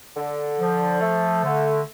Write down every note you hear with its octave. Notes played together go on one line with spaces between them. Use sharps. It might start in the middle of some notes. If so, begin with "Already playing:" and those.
D3
F3
A3
D3